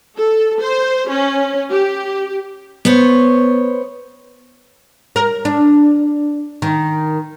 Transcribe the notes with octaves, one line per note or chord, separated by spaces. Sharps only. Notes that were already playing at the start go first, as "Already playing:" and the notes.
A4
C5
C#4
G4
B3 C5 C#5
A#4
D4
D#3